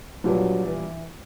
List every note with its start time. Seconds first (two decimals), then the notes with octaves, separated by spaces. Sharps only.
0.24 A#1 A#2 F#3 G3 B3 D4
0.66 E3